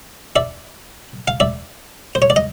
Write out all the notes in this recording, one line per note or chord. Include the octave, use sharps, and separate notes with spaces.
D5 E5
F5
D5 E5
C5
C#5
D5
D#5